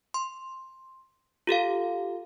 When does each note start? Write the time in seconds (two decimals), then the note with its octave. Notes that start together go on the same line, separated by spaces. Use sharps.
0.14 C6
1.47 F4 G4 A4 F5